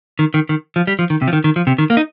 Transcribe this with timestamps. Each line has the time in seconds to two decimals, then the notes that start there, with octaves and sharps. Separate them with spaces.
0.19 D#3
0.34 D#3
0.49 D#3
0.76 F3
0.87 G3
0.99 F3
1.10 D#3
1.22 C3
1.28 F3
1.33 D#3
1.44 D#3
1.56 F3
1.67 C3
1.78 D#3
1.90 A#3
1.97 D#4